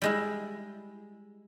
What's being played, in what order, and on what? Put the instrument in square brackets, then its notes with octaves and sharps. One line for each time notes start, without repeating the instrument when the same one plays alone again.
[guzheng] G3 G#3 E4